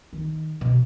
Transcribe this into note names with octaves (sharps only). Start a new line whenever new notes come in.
D#3
B2